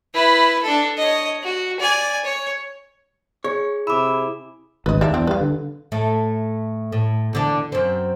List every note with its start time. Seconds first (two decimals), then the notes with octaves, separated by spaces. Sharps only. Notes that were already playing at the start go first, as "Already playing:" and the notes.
0.14 E4 B4
0.63 D4 A4
0.98 C#5 D#5
1.43 F#4
1.80 D5 G#5
2.25 C#5
3.44 G#4 C#5
3.87 C3 E4 G#4 B5 D6 E6
4.86 G#1 D2 B4 D#5
5.01 D#2 A#3 D4 E5
5.14 E2 C4 D4
5.27 G3 B4 F5
5.41 D3
5.92 A2 A3
6.92 A2
7.33 E2 D3 D4
7.72 F#2 C4